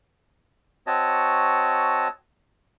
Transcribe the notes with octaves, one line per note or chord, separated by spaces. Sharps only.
C4 F#4 C#5 D#5 A5